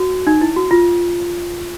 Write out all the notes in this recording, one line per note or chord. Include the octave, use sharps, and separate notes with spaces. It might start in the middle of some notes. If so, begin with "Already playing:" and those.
Already playing: F#4
D#4
E4
F#4
F4